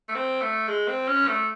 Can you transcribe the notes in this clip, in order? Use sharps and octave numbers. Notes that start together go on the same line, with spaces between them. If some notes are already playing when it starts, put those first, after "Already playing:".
A3
C4
A3
G#3
C4
C#4
A3